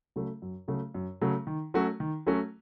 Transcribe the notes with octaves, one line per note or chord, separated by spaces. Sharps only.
C#3 F#3 A3
F#2
C#3 F#3 A3
F#2
C#3 F#3 A3
D#3
F#3 A3 C#4 F#4
D#3
F#3 A3 C#4 F#4